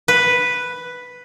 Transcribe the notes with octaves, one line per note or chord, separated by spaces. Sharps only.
B4